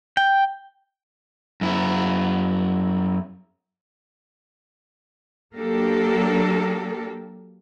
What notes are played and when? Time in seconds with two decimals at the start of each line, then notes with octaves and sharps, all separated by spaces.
0.17 G5
1.61 F#2 E4
5.55 F#3 A#3 D4 G4 A4 A#4